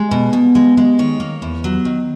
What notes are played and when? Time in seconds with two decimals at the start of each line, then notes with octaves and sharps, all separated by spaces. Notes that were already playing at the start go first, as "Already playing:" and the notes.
Already playing: G#3
0.11 B2
0.33 B2
0.55 G#3
0.77 G#3
0.99 D#3 C#5
1.20 A#3
1.42 E2
1.64 F#3
1.85 D#3